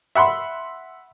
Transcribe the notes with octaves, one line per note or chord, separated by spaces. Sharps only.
E5 F#5 B5 C6